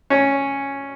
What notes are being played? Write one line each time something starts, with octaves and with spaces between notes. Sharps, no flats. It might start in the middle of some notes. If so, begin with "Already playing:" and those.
C#4